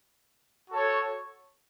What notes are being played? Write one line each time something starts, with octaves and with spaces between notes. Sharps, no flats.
F#4 A4 C#5